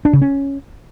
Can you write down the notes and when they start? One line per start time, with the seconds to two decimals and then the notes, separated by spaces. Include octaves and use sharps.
0.05 D4
0.13 C#3
0.22 C#4